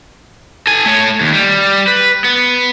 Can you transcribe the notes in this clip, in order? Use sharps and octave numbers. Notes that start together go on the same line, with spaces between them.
A4 G#5
A3 C#5
D#2
G3
B4
B3